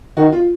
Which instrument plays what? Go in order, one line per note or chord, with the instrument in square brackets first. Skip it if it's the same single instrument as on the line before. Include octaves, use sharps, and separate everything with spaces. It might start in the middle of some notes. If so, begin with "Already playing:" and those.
[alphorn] D#3 [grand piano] F#4
[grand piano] F4